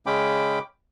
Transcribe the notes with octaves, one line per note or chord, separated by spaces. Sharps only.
C#3 G#3 C#4 G5 B5 D6